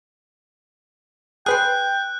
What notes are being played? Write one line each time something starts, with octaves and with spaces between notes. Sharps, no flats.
G#4 B4 G5 C6 F#6